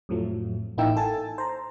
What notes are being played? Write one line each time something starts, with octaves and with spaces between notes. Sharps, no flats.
F2 A2 F3 F#3 A3
A1 A#3 D#4 E4 G5 E6
A4 G#5 A5 A6
C5 A#5